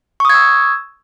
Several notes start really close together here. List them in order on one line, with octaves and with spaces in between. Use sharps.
C#6 D#6 G#6 E6